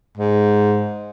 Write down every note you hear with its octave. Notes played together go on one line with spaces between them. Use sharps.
G#2